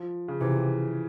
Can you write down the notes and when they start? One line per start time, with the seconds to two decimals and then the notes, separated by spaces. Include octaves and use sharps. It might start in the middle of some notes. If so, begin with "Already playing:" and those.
Already playing: F3
0.28 C#3
0.40 C3 E3